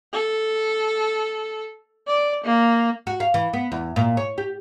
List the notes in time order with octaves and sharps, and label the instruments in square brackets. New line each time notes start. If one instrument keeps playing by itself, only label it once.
[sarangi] A4
D5
A#3
[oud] F#4
F5
E3
B3
E2
A#2
C#5
G4